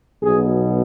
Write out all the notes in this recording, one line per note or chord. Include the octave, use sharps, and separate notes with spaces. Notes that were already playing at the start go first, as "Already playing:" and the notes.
B1 B2 G#4